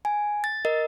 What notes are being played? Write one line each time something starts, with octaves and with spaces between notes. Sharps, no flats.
G#5
A6
A#4 D#5